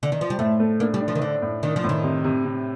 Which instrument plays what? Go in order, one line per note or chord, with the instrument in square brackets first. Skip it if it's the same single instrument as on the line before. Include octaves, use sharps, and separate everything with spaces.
[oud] D3
D#3
F3
G3
[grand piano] A2 [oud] A3
[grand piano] A3
[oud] A#3 [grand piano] D4
[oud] G3
[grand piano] D4
[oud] F3
D#3
[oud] D3 [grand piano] D4
[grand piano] A2
[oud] D#3 [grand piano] D4
[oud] F3
[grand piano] A2
[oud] D#3
[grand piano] C3
C3
C3